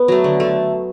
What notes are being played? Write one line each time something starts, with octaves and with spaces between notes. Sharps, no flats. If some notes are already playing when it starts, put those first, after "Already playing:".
Already playing: B3
F#3 A3
D3
A3